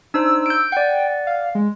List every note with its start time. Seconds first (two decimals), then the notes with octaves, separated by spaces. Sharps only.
0.14 D4 D#4 C5 E6
0.46 G6 D7
0.72 D5 F#5 G5
1.27 F5
1.55 G#3